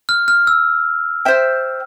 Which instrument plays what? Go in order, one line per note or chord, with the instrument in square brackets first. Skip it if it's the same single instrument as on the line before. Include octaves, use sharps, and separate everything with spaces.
[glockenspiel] F6
F6
E6
[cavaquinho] C5 E5 G5